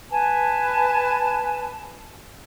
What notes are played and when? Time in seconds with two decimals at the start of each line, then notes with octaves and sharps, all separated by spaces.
0.11 B4 G#5 A5